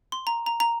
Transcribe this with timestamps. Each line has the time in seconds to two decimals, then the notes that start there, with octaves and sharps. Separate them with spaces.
0.12 C6
0.27 A#5
0.46 A#5
0.60 A#5